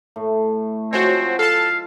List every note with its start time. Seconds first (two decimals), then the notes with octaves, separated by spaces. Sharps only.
0.16 A2 A3
0.93 F3 G#3 C4 F#4 C5 C#5
1.39 A4 F5 A5